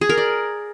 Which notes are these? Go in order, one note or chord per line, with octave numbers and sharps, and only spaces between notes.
G#4
A#4
D5